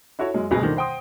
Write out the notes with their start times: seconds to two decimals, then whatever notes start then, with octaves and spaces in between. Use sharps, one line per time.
0.19 E4 F#4 A4 C#5
0.34 F#2 F#3 G#3
0.50 D#1 G#1 D2 B2 G#4 A#6
0.62 D3 D#3 F3
0.76 C5 F#5 G5 C6 D#6